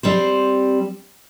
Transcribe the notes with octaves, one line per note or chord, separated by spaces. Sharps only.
G3 C4 C5